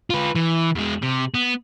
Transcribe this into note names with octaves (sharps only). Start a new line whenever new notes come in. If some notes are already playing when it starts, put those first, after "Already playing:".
F4 B4
E3
E2 G#3
C3
B3